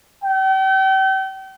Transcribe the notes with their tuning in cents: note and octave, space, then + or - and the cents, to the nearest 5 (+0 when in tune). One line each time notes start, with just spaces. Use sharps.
G5 -40